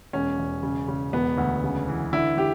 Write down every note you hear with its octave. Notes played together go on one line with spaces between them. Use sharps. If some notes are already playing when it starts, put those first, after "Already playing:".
E1 C#4
E1
C#3
C#3
E1 B3
D2
C#3
E3
D3 E4
D3 G4